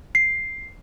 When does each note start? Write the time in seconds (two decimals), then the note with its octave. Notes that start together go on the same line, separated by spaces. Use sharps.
0.15 C7